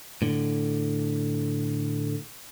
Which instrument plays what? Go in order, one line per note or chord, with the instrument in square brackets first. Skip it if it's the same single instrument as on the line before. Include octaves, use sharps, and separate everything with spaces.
[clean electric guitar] A2 D3